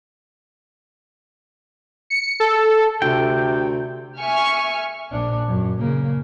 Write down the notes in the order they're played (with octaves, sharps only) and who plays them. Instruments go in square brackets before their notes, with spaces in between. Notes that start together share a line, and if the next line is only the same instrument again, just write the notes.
[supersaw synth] C#7
A4
[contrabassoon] D2 [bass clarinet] C3 [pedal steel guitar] G5
[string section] E5 G#5 C#6 F6
[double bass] A#1 D4
F#2
C#3 A#3